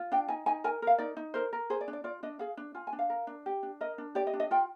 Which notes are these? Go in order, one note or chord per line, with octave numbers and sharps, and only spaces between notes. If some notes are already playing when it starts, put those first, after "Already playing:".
Already playing: F4
D4 G5
D#4 G#5
D#4 G#5
A#4 G#5
A#4 F5
D#4 D5
D#4
A#4 C5
A#4
G#4 C5
D5
D4
D5
F4 D5
D4 D#5
G#4 F5
D4
F4 G#5
G#5
D4
F5
A#4
D4
G4
D4
A#4 D#5
D4
G4 D5
D#5
D4
D#5
F4 G5